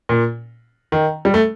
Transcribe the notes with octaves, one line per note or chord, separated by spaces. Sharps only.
A#2
D#3
G3
A3